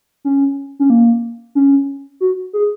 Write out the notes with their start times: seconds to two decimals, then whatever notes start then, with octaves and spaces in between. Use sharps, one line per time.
0.25 C#4
0.80 C#4
0.90 A#3
1.55 C#4
2.21 F#4
2.53 G#4